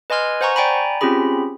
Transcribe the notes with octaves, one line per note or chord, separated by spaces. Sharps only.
B4 D#5 G#5 C6 F6 G#6
C5 F#5 G#5 A#5 C#6
D5 G5 G#5 A#5 B5
C4 C#4 F4 G4 G#4 B5